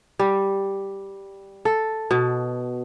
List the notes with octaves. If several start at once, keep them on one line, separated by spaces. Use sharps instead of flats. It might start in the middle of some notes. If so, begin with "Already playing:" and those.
G3
A4
B2